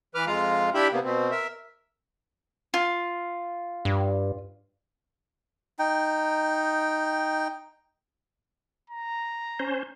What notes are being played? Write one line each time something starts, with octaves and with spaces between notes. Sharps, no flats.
E3 B4 D6 F6
F2 G#3 F4 F5 A#5
D4 E4 G4 E5 G5 B5
C3 A#3 B3
B2 C4
A#4 E5
F4
G2
D#4 G5
A#5
C#4 C5